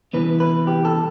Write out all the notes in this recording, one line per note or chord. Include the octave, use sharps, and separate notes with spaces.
C2 C3 E3 B3 B4
B4
G4
A4